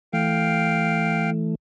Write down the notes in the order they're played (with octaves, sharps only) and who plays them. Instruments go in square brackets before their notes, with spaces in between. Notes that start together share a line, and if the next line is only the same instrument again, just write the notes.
[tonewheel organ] E3 A3 [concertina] F5 G5